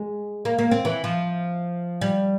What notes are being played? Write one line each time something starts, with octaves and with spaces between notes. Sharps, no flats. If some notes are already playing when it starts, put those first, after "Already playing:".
Already playing: G#3
A#3
A#3
C4
E3
F3
G3